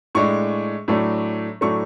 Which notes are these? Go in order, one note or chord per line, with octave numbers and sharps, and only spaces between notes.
A2 G#3 D4 C#6
A2 F#3 A3 D4
A2 F#3 A3 D4 C#6